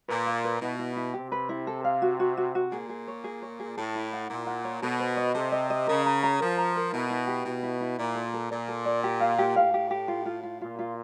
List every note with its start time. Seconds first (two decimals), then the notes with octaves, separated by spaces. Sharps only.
0.08 A#2 B4
0.26 F5
0.44 B4
0.61 B2 E4
0.79 E4
0.96 E4
1.14 C3 G4
1.32 B4
1.49 E4
1.67 A4
1.84 F5
2.02 F#4
2.20 F#4
2.37 F#4
2.55 F#4
2.72 A#2 G#4
2.89 G#4
3.08 C#5
3.24 G#4
3.42 C#5
3.60 G#4
3.77 A2 A4
3.95 E4
4.13 F#5
4.29 A#2 E4
4.47 F#5
4.65 C#5
4.82 B2 A4
5.00 C5
5.17 D#5
5.35 C3 A4
5.52 D#5
5.70 D#5
5.87 C#3 A#4
6.06 A#5
6.23 A#5
6.40 F3 A#4
6.58 A#5
6.76 A#4
6.92 B2 E4
7.10 E4
7.27 G4
7.45 B2 E4
7.63 E4
7.81 E4
7.98 A#2 D5
8.15 A4
8.34 A4
8.51 A#2 D5
8.68 A4
8.85 D5
9.04 G4
9.20 F5
9.39 G4
9.56 A2 F5
9.74 G4
9.91 G4
10.08 F4
10.26 F4
10.43 F4
10.61 A#2 F4
10.79 F4